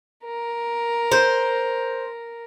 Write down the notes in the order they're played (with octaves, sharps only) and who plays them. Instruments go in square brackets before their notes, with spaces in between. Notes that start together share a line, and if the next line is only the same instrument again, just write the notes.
[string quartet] A#4
[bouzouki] C5